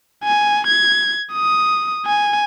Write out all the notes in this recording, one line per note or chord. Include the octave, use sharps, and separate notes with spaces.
G#5
G#6
D#6
G#5